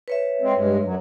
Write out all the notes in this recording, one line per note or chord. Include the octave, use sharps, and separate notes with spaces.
B4 C#5 E5
G#3 C4
G2 G#3
F#2 F#3